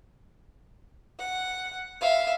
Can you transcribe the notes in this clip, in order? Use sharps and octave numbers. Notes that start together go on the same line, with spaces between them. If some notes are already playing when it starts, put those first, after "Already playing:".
F#5
E5 F5